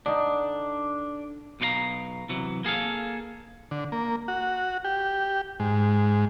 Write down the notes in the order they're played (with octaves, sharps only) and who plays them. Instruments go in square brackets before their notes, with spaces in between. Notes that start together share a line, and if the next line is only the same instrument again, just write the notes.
[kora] D3 D#4 [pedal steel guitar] D4
[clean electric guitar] B1 B2 D#4 F4 F5 A#5
C3 E3 F#3
A#3 G#4 A4 F5
[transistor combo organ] D3
A#3
F#4
G4
G#2